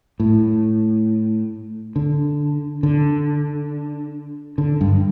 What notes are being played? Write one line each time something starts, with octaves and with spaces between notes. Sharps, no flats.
A2
D3
D3
D3
G2